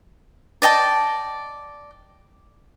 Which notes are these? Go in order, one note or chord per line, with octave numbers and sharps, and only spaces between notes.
D5 D#5 G5 A5